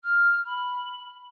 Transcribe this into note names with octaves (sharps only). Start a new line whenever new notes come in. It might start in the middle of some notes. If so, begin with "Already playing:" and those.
F6
B5